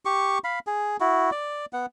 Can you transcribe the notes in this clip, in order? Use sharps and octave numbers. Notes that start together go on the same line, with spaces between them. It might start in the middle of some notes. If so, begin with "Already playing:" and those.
G4 C#6
F5 B5
G#4
E4 F#4
D5
B3 F#5